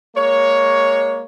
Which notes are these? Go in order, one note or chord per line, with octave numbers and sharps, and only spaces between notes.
G#3 A#3 C#5